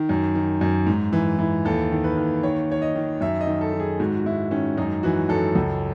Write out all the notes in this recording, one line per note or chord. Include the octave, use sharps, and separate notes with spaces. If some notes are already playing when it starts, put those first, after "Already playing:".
Already playing: D#3
F#2
D#3
F#2
G#2
E3
E3
D#2 A4
D#3
B4
D#2
D#3 C#5
D#3 C#5
D#5
D#3
F#2 E5
D#5
D#3
A4
D#3
G#4
G#2 F#4
F#4
G#2 E4
D#3 C#4
F#2 D#4
E3 F#4
F#2 A4
C#2